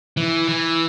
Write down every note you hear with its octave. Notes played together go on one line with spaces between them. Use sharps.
E3
E3